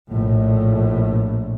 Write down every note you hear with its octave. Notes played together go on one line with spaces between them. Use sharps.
A#1 A2